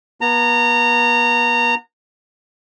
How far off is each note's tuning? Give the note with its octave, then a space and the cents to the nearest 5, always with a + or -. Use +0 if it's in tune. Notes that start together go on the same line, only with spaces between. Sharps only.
B3 -35 A#5 -25